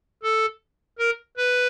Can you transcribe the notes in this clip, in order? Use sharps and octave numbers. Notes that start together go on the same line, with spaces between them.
A4
A#4
B4